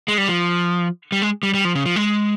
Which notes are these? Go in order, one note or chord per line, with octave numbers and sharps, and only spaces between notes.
G#3
G3
F3
G3
G#3
G3
G3
F3
C#3
F3
G#3